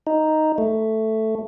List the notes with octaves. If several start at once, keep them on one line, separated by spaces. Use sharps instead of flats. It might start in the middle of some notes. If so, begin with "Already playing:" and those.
D#4
A3